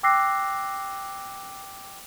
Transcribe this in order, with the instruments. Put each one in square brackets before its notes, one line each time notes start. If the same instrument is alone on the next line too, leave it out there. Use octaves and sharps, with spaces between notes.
[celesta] G5 D6 E6 F#6 A#6 C7